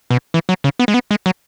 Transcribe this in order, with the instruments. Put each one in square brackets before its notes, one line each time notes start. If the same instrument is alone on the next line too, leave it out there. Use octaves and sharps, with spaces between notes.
[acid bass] B2
E3
F#3
C#3
B3
G#3
B3
G#3
F#3